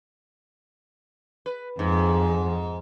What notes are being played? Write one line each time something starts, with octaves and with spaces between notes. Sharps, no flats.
B4
F2 G#2